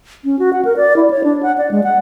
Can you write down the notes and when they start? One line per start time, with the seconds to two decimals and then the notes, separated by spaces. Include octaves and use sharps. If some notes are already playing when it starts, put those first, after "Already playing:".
0.25 C#4
0.39 F#4
0.53 F#5
0.65 A#4
0.77 D5
0.96 E4
1.10 C#5
1.24 D4
1.43 F#5
1.58 D5
1.71 G#3
1.83 F#5